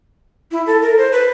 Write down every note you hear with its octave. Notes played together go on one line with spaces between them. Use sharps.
E4
A4
A#4
C5
B4